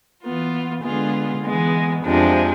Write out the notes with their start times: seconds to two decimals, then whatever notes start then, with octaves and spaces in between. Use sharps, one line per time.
0.23 E3 B3 F4
0.83 D3 G#3 B3 F4 G#4
1.44 E3 G#3 B3
2.05 F2 C3 F3 G#3 D4